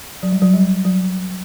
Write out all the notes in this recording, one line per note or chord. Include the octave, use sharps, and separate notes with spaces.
F#3
G3
F#3
G3
F#3